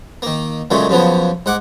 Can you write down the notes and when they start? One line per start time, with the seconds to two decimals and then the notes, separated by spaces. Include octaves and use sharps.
0.22 D#3 A#3
0.71 F#2 A#2 C#3 G#3 A3
0.89 F#2 C#3 F3 B3
1.46 G#2 F#5 D6